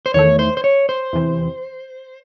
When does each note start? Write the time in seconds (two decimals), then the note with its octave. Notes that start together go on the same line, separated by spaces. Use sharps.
0.06 C5
0.14 E2 D#3 A3 C#5
0.39 C5
0.57 C5
0.64 C#5
0.89 C5
1.13 E2 C3 E3